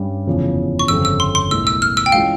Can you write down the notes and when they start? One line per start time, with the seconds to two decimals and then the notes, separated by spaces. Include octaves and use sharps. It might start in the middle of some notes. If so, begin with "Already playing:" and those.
Already playing: G2 G3 C#4
0.26 F1 E2 C#3 F3
0.79 C#6
0.88 G1 F2 C#3 G3 C4 E6
1.05 E6
1.20 C6
1.35 C6
1.50 C2 A#2 F3 G#3 E6
1.67 E6
1.82 F6
1.97 E6
2.06 G5
2.12 E3 G#3 C#4 F4 F5